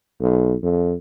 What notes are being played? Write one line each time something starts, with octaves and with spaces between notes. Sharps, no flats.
B1
F2